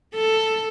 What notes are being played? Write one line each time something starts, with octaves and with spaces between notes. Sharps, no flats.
A4